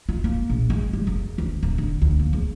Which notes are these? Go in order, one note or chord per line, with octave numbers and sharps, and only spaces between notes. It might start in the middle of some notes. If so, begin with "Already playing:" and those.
F4
A#3
A#1
G#3
G3
F#1
D2
D1
D3
D2
A#3
C#2